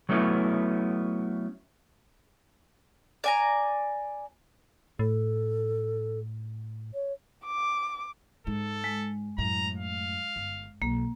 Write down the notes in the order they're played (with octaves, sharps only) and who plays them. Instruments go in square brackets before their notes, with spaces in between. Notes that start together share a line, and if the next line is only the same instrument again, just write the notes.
[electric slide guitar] F#3 A3 B3 C#4 E4
[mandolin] D5 G#5 A#5
[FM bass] A2 [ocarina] A4
[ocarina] C#5
[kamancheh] D6
[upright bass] G#2 [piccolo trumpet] A4
[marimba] G#3
[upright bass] F#2 A2 [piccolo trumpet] A#5
[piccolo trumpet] F5
[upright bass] G1
[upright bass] B1 [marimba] A#3